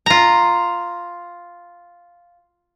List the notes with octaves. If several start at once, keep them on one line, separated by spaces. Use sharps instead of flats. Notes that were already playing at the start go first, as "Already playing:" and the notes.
F4 A#5